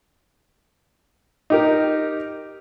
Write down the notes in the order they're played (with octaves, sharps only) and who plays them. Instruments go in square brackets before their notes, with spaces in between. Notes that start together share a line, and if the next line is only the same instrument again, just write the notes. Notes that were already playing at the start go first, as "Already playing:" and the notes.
[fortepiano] D#4 G4 A#4